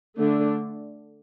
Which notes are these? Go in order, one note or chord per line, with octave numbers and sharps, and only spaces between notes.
D3 A3 D4